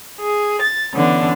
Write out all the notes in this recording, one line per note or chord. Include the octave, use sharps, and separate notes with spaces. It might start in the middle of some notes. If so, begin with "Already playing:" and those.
G#4
A6
D3 E3 B3 C#4 D4